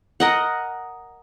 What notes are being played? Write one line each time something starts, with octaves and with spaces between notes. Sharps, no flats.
A#4 D#5 F#5